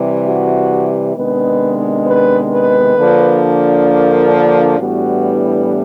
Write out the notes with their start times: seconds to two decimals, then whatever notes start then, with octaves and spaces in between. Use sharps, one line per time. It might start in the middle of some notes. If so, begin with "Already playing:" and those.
Already playing: C3 E3 G3
0.26 F#4
1.16 C3 D#3 G#3 B3 D4 B4
2.07 B4
2.52 B4
2.97 D3 F3 A#3 D4
3.88 A#4
4.79 A2 E3 G3 B3 D4 F#4